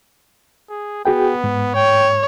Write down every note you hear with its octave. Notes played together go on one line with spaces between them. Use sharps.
G#4
B3 F#4 G#4 G5
G#2
C#5 G5